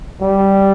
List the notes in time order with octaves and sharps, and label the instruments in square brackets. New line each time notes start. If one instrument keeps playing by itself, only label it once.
[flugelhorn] G3